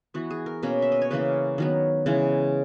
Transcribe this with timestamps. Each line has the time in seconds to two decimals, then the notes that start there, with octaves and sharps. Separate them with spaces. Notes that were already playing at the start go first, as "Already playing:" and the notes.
0.14 E3 B3 F#4
0.31 G#4
0.46 A#4
0.63 B2 A#3 C#4
0.82 E5
0.92 D#5
1.01 C#5
1.10 C#3 E3 A#3 C#4 B4
1.58 D#3 F#3 B3
2.06 C#3 E3 G#3 C#4